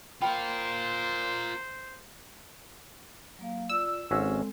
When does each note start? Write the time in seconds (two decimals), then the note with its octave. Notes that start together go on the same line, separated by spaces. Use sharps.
0.22 F4 A#4 C5 G5 B5
3.39 F#3 A#3 F5
3.69 F4 D5 E6
4.11 G#1 G#3 C4 C#4 F#4 A4